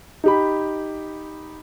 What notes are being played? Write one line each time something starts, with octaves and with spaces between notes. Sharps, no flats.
D#4 G4 B5